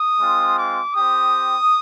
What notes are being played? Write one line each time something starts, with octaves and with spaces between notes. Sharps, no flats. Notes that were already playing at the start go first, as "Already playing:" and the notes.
Already playing: D#6
G#3 C4 F4
D6
C4 G4 D#6